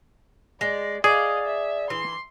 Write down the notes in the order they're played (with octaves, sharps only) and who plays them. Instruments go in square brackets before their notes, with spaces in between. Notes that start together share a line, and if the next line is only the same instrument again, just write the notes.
[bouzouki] G#3 [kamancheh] D5
[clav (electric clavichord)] G#4 [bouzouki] D5 [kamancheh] D#5 F5
[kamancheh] E5
[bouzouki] E3 [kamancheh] C6